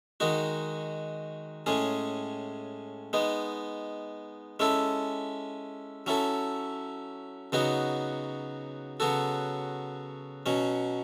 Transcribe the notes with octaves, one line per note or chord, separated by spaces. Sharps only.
D#3 G#3 D#4 F#4
A2 G#3 C#4 G#4
G#3 B3 D#4
G#3 C#4 E4 A4
F#3 C#4 E4 A4
C#3 F#3 B3 D#4 F#4
C#3 F#3 B3 F#4 A4
B2 F#3 C#4